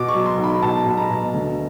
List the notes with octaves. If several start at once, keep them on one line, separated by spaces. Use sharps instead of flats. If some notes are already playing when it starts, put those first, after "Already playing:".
Already playing: B2 D6
C#6
F#3
C6
B1
B5
B2 A5
B2 B5
A#5
B2
D2